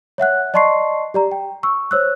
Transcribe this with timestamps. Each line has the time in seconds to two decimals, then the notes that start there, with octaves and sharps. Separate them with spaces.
0.18 C#5 E5 F#5 F#6
0.54 D5 D#5 A5 C6 C#6 C7
1.14 G4 D5 A#5
1.31 G5
1.63 C#6 E6
1.91 C5 C#5 E6 F#6